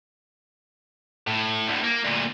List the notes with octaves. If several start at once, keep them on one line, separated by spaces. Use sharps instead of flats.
A2
D2 A2
A#3
D2 A#2